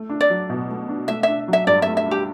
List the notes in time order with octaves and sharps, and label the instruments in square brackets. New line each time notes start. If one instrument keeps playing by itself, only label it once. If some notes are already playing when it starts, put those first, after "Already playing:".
Already playing: [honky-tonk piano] A3
D4
[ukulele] D5
[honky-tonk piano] F#3
B2
A3
D4
[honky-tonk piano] A3 [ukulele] E5
[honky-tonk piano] D4 [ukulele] E5
[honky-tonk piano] F#3 [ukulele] E5
[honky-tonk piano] G2 [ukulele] D5
[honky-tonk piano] A3 [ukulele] E5
[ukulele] E5
[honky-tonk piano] D4 [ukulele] G4